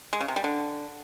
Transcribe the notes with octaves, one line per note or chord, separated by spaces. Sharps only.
G#3
C#3
C3
G3
D3